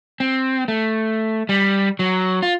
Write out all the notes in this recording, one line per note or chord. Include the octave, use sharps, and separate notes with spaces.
C4
A3
G3
F#3
F4